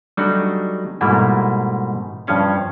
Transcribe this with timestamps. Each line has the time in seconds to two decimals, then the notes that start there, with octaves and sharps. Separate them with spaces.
0.17 F#3 G3 A3 D4 D#4 F#4
1.01 G#2 B2 G3 A3 A#3 E4
2.27 G2 F3 C#4 F5